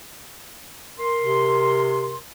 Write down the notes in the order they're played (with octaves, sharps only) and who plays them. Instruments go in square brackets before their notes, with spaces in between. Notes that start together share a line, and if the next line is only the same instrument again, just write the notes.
[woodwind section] A#4 C6
[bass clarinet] C3